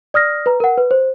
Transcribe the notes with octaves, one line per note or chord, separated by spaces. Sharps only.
D5 D#6 F6 A#6
B4 A#5
A#4 F#5
B4
C5